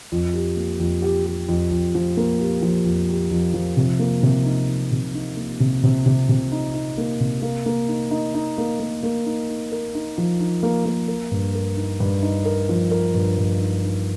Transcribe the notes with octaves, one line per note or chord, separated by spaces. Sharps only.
F2
G4
A#3
F2
G4
G4
F2
F2
F3
A#3
G4
F3
F2
G4
F2
F3
C3
A#3
C3
D#4
D#4
C3
D#4
A#3
C3
C3
C3
C3
D#4
D#4
A#3
C3
A#3
A#3
D#4
D#4
D#4
A#3
A#3
A#3
D#4
D#4
A#4
D#4
F3
D#4
A#3
A#3
A#4
G2
A#4
D#4
G2
D#4
A#4
F3
A#4
G2
G2
D#4
D#4